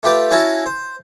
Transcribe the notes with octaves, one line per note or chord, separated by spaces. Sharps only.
A3 F4 G4 B4 D5
C#4 E4 F#4 F5 A5 A#5
C5